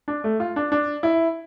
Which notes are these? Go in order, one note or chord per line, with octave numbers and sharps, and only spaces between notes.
D4
A3
F4
D4
D4
E4